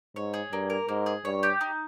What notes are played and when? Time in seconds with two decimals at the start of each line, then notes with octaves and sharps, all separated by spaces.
0.16 G#2 C#5
0.34 G#4
0.52 G2 A#3
0.70 A#4
0.89 G#2 A#3
1.06 G#4
1.25 G2 C#5
1.43 G4
1.61 D#4